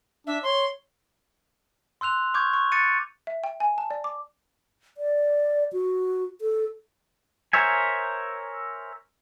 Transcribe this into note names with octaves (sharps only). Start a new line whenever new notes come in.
D4 E5
C#5 C6
C6 E6 F#6 F7
C#6 D6 G6 G#6
C#6
D6 F#6 A6 C#7 D#7
E5
G5
G#5
A5
D5
D6
D5
F#4
A4
A#4 C5 C#5 E5 G#5